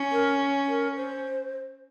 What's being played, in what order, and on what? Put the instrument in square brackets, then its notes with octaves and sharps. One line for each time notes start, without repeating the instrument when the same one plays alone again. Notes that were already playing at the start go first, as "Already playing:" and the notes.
Already playing: [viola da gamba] C#4
[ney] A#4
A#4
C5